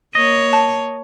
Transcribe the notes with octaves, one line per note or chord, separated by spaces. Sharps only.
A#3 C#5 D#5
A5